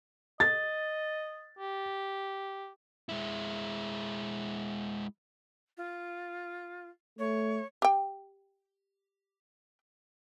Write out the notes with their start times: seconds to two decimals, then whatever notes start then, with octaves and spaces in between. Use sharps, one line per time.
0.40 D#5 A6
1.59 G4
3.09 G#3 E4
5.77 F4
7.19 A3 C#5
7.82 G4 G5